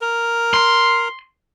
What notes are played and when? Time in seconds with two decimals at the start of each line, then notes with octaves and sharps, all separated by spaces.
0.01 A#4
0.54 C6